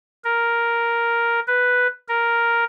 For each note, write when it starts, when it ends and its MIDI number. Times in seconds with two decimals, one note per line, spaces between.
0.24 1.40 70
1.47 1.87 71
2.08 2.64 70